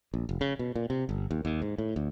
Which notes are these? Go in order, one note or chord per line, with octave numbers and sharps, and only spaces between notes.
A#1
F1
C#3
B2
A#2
C3
G1
D#2
D#2
G#2
A2
D2